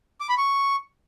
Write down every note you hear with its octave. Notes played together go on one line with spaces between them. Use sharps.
D6
B5
C#6